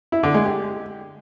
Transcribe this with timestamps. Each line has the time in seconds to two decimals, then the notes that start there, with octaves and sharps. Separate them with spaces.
0.12 E4
0.23 D3
0.34 G#3
0.45 G4